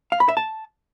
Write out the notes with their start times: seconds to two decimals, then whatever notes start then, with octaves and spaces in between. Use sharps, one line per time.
0.12 F5
0.20 B5
0.29 E5
0.37 A5